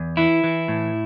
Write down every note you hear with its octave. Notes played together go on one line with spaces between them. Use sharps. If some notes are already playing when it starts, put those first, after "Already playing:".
Already playing: E2
E3 E4
E3
A2